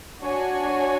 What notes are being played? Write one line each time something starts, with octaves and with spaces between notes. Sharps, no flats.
D4 F#4 C#5 G#5